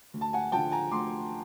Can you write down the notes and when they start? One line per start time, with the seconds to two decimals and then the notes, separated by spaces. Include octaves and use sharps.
0.14 D2
0.21 A5
0.33 F#5 G#5
0.52 D3 F3 G5 A5
0.71 G#5 A#5
0.91 D2 C6 D6